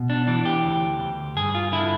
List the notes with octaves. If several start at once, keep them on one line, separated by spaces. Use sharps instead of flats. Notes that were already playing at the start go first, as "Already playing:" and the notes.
Already playing: B2
D4
E3 D4
G4
D2
D2
G2 G#4
F4
D3 E4